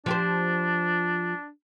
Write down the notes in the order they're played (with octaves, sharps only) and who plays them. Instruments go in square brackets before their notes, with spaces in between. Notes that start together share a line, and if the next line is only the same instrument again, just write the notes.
[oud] F3 G4 C5 [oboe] D4